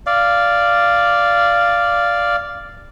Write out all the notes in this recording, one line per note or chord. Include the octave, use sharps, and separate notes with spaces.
D5 F5